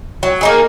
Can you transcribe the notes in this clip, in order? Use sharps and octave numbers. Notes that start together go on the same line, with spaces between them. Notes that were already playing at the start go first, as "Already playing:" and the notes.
F#3
A#3 D#4 G#4